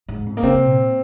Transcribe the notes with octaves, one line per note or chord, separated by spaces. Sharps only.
G#2
F2
A#3
C3 C4
A#2